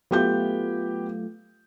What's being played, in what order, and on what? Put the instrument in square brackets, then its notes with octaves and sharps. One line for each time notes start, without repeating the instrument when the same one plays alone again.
[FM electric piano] F#3 A3 F4 [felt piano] B3 G4 G6